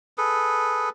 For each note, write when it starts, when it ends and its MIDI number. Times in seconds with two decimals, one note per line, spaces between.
0.18 0.89 68
0.18 0.89 69
0.18 0.89 71